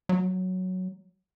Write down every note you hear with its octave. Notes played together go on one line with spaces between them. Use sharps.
F#3